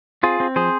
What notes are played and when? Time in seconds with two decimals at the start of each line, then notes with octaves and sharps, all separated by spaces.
0.23 C4 F4 G#4
0.40 C4
0.56 F3 G#4 C5